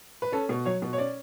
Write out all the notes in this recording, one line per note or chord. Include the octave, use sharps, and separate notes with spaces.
B4
C#4 A4
B2
F#3 C#5
B2
C#5
C#4 D5